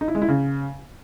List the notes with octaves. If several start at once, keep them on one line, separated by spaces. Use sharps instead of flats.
D#4
E4
G#3
E4
C#3